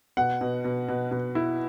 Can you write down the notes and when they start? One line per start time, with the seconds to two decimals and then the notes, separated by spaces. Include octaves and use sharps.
0.17 B2 F#5
0.41 B2
0.64 B2
0.89 B2
1.11 B2
1.35 E4